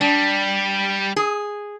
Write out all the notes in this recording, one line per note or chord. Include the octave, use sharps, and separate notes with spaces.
G3 D4
G#4